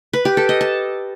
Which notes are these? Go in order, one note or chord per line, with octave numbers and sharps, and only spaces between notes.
B4
G4
A4
D#5
A5